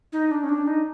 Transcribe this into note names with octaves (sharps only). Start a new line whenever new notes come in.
D#4
D4
C#4
D4
D#4